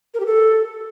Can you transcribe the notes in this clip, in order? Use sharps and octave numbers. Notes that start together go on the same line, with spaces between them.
A#4
G4
A4